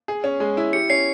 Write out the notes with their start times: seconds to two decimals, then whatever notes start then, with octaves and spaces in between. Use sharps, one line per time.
0.08 G#4
0.24 C#4
0.40 G#3
0.57 E4
0.73 G4 C#7
0.90 C#4 C7